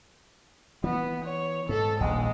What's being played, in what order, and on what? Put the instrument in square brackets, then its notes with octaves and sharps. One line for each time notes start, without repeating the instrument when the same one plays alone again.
[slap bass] E3 [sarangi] B3
[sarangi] C#5
[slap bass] G#2 [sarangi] A4
[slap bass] D#1 A#1 D#2 [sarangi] G#3